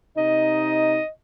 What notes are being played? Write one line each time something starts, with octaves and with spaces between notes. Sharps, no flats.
C3 D#4 D#5